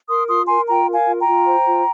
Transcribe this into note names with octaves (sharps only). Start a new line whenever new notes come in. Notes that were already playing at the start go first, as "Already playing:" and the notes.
A#4 C6 D#6
F4 C6 D#6
A#4 G#5 C6
F4 G5 A#5
A#4
F5 G#5
F4
G5 A#5
F4
C5
F4